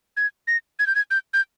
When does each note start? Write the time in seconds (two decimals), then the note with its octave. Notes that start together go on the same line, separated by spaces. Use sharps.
0.17 G#6
0.48 A#6
0.79 G#6
0.87 G6
0.95 G#6
1.11 G6
1.34 G6